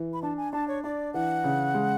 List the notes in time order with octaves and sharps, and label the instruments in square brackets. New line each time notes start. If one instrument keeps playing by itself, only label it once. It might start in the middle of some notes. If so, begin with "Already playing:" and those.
Already playing: [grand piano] E3
[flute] B5
[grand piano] D4 [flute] A5
[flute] G#5
[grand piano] D4 [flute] A5
[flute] C#5
[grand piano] D4 [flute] D5
[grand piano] E3 [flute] F#5
[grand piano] C#3
G#3